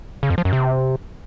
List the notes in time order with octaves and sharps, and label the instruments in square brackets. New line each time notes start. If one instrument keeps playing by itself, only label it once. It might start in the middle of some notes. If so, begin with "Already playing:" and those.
[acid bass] C#3
F2
F3
F#2
C3